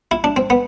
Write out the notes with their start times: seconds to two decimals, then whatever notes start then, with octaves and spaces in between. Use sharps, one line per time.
0.11 E4
0.24 D4
0.36 C4
0.50 B3